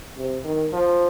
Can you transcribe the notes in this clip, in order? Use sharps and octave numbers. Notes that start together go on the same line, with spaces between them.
C3
D#3
F3